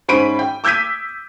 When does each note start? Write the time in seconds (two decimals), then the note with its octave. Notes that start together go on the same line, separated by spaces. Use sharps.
0.08 G#2 C#4 C5 B5 D7 D#7
0.39 G5
0.64 D6 E6 G6 G#6 B6 D#7